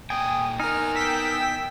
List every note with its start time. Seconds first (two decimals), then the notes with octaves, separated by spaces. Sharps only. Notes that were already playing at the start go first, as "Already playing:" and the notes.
0.10 A#2 G5 G#5 D#6
0.60 B3 D#4 A#4 G#5 F6
0.95 G5 E6 B6